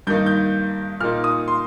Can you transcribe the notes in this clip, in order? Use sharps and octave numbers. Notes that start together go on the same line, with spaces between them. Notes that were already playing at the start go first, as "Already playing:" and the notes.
G2 D#3 A#3 D#4 G6
G6
A#2 A#3 D#4 F6
D#6
C6